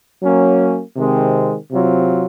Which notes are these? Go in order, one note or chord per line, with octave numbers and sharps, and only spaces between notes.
F#3 A#3 C#4
C3 D#3 G#3 C4
C3 F#3 C4 F4